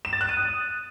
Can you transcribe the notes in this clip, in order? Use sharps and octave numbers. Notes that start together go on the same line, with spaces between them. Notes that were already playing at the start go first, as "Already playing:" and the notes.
E7
A6
F#6
D#7
D#6